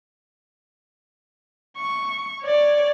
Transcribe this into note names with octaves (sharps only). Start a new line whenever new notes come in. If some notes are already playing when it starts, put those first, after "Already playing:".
C#6
C#5 D5